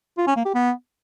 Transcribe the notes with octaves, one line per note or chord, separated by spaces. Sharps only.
F4
C#4
A#3
G4
B3